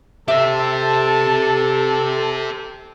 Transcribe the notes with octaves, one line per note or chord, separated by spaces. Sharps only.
G4 A4 C5 E5 A5